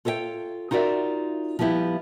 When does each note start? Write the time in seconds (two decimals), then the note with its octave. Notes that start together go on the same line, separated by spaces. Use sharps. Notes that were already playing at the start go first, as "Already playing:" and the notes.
0.05 F4 A4 C#5 D#5 G5
0.71 D#4 F4 F#4 A#4 D5 E5
1.59 F3 G3 B3 E4 G4